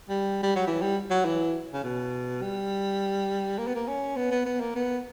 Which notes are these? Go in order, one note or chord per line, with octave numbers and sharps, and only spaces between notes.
G3
G3
F#3
E3
G3
F#3
E3
C#3
B2
G3
A#3
B3
A#3
C#4
B3
B3
B3
A#3
B3